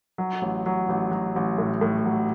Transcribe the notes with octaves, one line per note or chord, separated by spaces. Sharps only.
F#3
A1
F#3
A1
F#3
A1
A2
A2
F#3